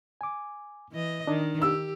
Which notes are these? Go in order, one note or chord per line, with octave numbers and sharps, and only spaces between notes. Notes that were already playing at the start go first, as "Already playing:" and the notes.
G#5 D6
E3 D#5
D#3 D4 D#4
G4 E6